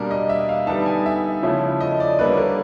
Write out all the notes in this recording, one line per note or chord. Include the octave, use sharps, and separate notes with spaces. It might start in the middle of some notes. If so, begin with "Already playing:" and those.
Already playing: B2 G3 A#3 D4 A#4
D#5
E5
F5
D3 G3 B3 D#4 A5
G#5
E5
C#3 F3 A3 C#4 E4
D#5
D5
D3 G3 A#3 C#4 B4
A#4